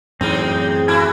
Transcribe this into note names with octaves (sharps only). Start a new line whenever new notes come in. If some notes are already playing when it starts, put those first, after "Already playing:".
F#2 A2 E3 F#3 G#3 C4 D#4
A3 E4 F#4 G#5